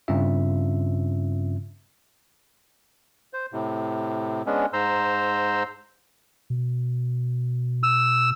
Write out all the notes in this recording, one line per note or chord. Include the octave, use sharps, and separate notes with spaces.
G2 C#3 C4 C#4 F4 E5
C5
A2 C3
G#3 B3 C#4 D4
G#2 C5 A#5 C6 E6
B2
E6